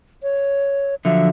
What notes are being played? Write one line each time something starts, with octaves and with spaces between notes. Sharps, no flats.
C#5
D3 F3 F#3 E5